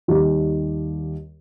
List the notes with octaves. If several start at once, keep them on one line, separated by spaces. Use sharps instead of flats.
D#2 D#3 G3 D#4 G4